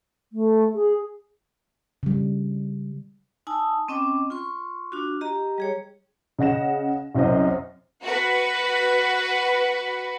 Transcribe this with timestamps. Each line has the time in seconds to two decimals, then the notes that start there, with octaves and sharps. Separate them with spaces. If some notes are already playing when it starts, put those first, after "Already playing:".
0.33 A3
0.74 G#4
2.03 C#3 G3
3.47 D#4 G#5 A5 D#6 E6
3.88 C4 C#4 D#5 G5 D6
4.30 F4 C6 C#6
4.92 D4 F4 F#4
5.21 G4 D#5 A#5
5.58 G3 G#4 C#5
6.39 C#3 D#5 F#5 A#6 E7
7.15 C2 F#2 F#3 C5 D#5
8.02 F#4 B4